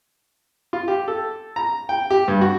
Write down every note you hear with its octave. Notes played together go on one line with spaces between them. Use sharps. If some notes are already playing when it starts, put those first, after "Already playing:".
F4
G4
A4
A#5
G5
G4
G2
F#4